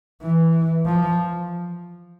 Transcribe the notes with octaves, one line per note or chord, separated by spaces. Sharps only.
E3
F3